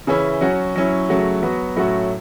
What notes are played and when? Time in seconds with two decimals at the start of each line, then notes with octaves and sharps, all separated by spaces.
0.07 C#3 E3 C#4 E4
0.41 F#3 C#4 F#4
0.76 F#3 C#4 E4
1.09 C#3 F#3 A3 F#4
1.42 F#3 B3 F#4
1.76 A2 F#3 A3 C#4 F#4